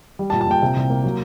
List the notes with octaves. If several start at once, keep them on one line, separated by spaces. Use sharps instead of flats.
G3
A5
A#2
A5
A#2 G5
C3
C2
A#3
F#3